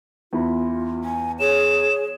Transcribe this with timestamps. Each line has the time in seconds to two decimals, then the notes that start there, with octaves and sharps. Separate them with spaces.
0.33 E2 E4 F4 B5
1.04 G#5
1.40 G#4 C#5 E7